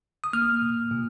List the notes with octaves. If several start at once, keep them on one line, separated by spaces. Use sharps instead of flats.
D#6
A#3 F6
A#2
A#2